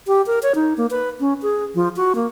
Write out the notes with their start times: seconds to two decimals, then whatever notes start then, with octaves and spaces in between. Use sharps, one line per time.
0.07 G4
0.27 A#4
0.43 C#5
0.55 D#4
0.77 A#3
0.91 B4
1.20 C#4
1.42 G#4
1.75 F3
1.97 F#4
2.15 A#3